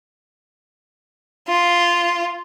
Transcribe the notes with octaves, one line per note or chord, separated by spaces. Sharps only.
F4